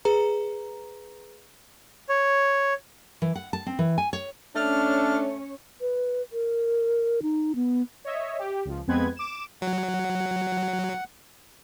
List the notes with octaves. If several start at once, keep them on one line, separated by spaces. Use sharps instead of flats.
G#4 B4 A#5
C#5
E3
F#5
A5
C4
E3
G#5
C#5
A3 C#4 D4 C#5 F6
B4
A#4
D#4
B3
C#5 D#5 E5
G4
C#2 F3
F2 G#3 B3 C4 B4 G#6
D6 E7
F#3 F#5